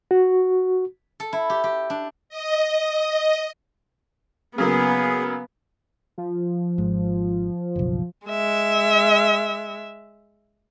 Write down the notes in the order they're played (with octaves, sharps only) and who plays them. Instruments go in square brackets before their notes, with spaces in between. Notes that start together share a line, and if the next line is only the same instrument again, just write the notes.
[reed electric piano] F#4
[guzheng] A4
E4
G4
G4
D4
[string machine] D#5
[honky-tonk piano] C#3 F#3 A#3 [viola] B3 [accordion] G#4
[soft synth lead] F3
[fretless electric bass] G#1 G#2
F#1 B1
[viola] G#3 E5